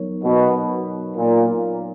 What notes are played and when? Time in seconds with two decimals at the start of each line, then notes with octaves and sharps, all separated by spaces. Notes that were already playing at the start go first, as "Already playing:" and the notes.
Already playing: F#3 B3 D#4 A#4 C#5
0.24 B2
1.16 A#2